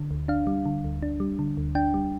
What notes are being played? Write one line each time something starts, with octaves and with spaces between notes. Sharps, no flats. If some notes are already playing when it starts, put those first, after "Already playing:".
Already playing: D3
D2
D4 F5
G3
D3
D2
D4
G3
D3
D2
D4 G5
G3